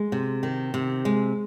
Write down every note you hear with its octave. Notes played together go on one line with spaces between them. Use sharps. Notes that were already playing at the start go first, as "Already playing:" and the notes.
Already playing: G#3
C3
D#3
C3
G#3